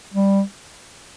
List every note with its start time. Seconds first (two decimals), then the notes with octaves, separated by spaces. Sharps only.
0.14 G3